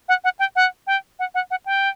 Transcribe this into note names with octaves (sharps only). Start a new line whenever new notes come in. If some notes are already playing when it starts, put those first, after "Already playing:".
F#5
F#5
G5
F#5
G5
F#5
F#5
F#5
G5